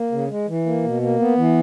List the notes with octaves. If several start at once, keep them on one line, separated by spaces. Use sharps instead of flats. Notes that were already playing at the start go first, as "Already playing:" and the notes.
Already playing: A#3
C#3
G#3
E3
A#3
B2
A#3
B3
E3